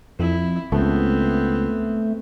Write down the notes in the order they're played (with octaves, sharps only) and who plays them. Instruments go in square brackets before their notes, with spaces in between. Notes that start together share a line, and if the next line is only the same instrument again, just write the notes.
[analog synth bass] F2 [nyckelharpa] E4
[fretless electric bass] C#2 [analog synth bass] A3 [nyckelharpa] B3 C4